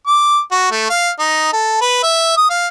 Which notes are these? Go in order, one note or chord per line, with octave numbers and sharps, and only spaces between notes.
D6
F#4
A3
F5
D#4
A4
B4
E5
D#6
F5